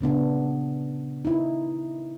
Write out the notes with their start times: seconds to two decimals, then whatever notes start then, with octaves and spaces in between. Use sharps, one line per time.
0.01 A#2 C#3 B3 D4
1.25 D#4 E4